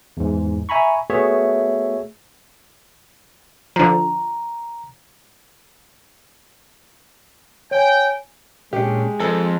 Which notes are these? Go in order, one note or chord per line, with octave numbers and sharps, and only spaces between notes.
E2 G#2
E5 G#5 A#5 B5 C#6
A3 B3 F#4 G#4 C#5 E5
D3 F3 A#5
C#5 G5 G#5
A#2 G#3 C#4 D4 G4
F2 F3 A4